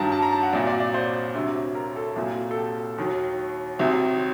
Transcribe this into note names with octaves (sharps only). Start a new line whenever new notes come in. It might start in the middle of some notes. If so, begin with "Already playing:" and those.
Already playing: G2 D#3 F#3 A5 A#5
A5
A#5
A5
F#5
C2 A#2 F#3 D5
D5
D5
C5
D2 C3 F#3
A#4
A4
C2 A#2 F#3
A4
G4
D#2 D#3 F#3
C2 C3 D#3 F#3